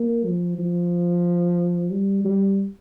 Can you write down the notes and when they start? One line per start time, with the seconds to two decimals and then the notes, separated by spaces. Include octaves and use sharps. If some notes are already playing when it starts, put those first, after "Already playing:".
Already playing: A#3
0.25 F3
0.59 F3
1.91 G3
2.24 G3